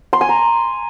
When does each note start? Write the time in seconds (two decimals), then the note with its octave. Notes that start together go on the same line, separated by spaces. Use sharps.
0.13 C6
0.21 G#5
0.29 A#5